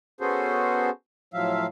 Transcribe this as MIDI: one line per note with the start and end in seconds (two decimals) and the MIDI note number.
0.21 0.90 59
0.21 0.90 61
0.21 0.90 66
0.21 0.90 68
0.21 0.90 69
0.21 0.90 72
1.34 1.66 45
1.34 1.66 53
1.34 1.66 54
1.34 1.66 76
1.34 1.66 77